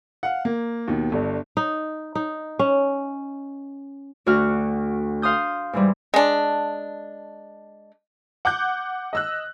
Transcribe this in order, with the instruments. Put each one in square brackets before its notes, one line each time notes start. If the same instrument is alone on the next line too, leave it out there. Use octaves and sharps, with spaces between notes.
[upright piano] F5 F#5
A#3
D#2 B2 D#3
G1 G2
[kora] D#4
D#4
C#4
[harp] D2 F#4 F6
F5 C6 D#6 G6
G#2 E3 G3
[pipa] G#3 D4
[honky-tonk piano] F#5 D6 F#6 G6
D#5 E6 F#6